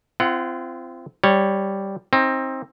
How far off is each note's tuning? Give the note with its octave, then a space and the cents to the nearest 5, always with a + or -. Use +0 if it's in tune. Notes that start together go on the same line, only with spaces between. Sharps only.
C4 -10 F4 -35 F#5 +10
G3 +0 C#5 -10
C4 +20 D#4 +25